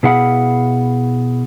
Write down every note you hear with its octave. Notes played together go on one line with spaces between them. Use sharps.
B2 E4 G#4 F5 F#5 B5